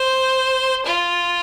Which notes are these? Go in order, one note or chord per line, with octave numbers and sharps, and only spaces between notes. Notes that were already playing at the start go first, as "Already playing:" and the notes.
Already playing: C5
F4